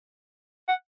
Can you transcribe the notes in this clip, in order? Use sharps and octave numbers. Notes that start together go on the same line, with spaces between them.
F#5